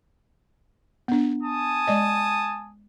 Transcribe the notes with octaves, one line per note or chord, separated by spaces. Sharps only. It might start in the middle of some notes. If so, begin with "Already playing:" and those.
B3 D4
G#5 A5 D#6
G#3 D5 D#5